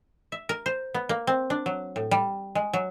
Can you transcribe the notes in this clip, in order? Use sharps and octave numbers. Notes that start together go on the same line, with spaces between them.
E5
A#4
C5
B3
A#3
C4
D4
F#3
A2
G3
G#3
F#3